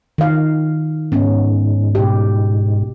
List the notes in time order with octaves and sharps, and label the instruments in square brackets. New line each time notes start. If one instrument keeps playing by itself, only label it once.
[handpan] D#3 F5
[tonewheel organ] G#2 [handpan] B3 C#4
[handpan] B2 G4